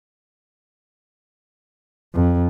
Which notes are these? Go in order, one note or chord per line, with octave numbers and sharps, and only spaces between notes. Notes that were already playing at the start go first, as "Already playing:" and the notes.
F2